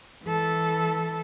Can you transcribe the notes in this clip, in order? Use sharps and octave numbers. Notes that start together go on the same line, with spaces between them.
E3 A4